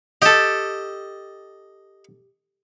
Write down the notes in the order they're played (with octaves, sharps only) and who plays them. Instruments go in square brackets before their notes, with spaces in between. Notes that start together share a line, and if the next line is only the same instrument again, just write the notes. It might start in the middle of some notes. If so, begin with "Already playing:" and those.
[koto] G4 A4 [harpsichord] D#5